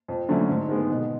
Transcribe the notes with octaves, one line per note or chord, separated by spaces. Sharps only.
F2
D3 F#3 A3 C#4
G#2
D#3 G#3 B3
B2